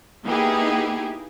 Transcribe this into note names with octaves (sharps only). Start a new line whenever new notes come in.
A#3 B3 D#4 E4 G4 G#4